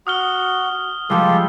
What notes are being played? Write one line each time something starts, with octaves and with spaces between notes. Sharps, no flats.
F#4 D#6 F6 G7
F3 G3 G#3 F4 G4 A4